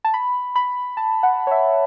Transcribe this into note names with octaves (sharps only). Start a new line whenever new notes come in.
A5
B5
B5
A5
F#5
C#5
E5